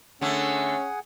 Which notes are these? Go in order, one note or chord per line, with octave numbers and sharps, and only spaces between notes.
D3 A3 C#4 G#4 F#5 G#5